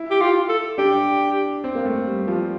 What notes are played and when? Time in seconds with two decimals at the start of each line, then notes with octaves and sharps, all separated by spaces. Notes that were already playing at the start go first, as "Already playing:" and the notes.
Already playing: E4
0.11 G4
0.21 F4
0.49 A4
0.78 D4 G4
1.64 C4
1.75 A#3
1.85 A3
2.07 G3
2.28 F3